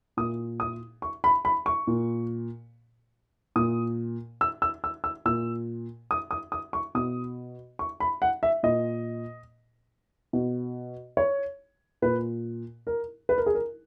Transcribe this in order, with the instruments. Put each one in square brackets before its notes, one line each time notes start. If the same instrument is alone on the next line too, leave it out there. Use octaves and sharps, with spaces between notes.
[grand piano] A#2 D#6
D#6
C#6
B5
B5
C#6
A#2
A#2 D#6
E6
E6
E6
E6
A#2 E6
D#6
D#6
D#6
C#6
B2 D#6
C#6
B5
F#5
E5
A#2 D#5
B2
C#5
A#2 B4
A#4
B4
A#4
G#4
A#4